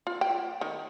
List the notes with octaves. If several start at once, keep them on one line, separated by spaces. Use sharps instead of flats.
F4
G5
D#3